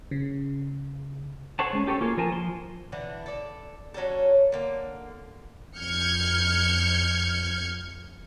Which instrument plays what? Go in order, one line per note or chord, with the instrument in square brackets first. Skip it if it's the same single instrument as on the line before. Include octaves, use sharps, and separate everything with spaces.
[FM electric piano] C#3
[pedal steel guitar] A4 C5 C#5 F#5 A5
G#3 C#4
C#4 G4 A4 A#4 C#5
A#3 F4 G#4
F3 A#4 G#5 A5
F3 C6
[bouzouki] D3 E3 D4
A4 D5
F#3 C#4 D4 A4
D3 A#3
[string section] F2 F6 G6 G#6 C#7